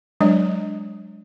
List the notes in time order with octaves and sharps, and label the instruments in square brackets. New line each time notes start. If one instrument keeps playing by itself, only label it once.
[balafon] F#3 G#3 D4 C#5 D#5